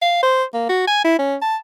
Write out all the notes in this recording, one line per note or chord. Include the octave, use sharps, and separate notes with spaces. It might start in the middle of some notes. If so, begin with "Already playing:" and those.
F5
C5
A#3
F#4
G#5
E4
C#4
A5